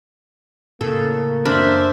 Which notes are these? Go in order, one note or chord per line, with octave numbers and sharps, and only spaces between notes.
A2 C#3 A#3 A4
F#2 D4 C5 E5 B5 F6